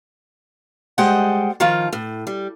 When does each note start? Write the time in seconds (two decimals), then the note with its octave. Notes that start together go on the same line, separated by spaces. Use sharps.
0.98 G3 G#3 C5 D#5 F#5 G5
1.60 D#3 F3 F4
1.93 A2
2.27 G3